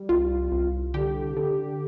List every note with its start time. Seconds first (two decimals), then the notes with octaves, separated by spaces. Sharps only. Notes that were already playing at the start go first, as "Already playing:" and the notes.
Already playing: G3
0.09 C2 F4
0.52 C2
0.94 D3 G4
1.37 D3